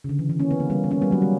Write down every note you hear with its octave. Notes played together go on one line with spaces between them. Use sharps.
C#3
D3
E3
E3
A#3 C#4
B3
A#3
G3 B3
B3
A#3 C#4
G3 B3
F#3 A#3
G3